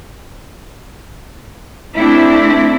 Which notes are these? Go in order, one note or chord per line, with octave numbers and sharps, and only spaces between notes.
A3 C4 D4 E4